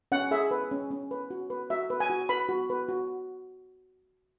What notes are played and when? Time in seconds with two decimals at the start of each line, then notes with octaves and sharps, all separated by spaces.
0.12 C#4 F#5
0.31 G#4 E5
0.51 B4
0.71 C#4
0.91 C#4
1.11 B4
1.31 F#4
1.50 B4
1.70 F#4 E5
1.90 B4
2.00 G#5
2.10 F#4
2.29 B4 B5
2.49 F#4
2.70 B4
2.89 F#4